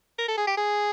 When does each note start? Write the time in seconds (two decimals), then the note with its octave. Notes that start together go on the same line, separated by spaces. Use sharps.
0.19 A#4
0.28 A4
0.38 G#4
0.47 G4
0.57 G#4